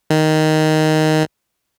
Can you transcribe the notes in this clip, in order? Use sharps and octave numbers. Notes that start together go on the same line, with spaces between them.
D#3